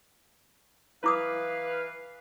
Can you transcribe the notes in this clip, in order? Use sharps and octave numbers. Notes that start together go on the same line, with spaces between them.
E3 E4 B4 F5 D6 D#6